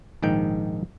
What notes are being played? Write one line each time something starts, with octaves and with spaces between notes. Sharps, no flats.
A#1 G#2 D#3 G5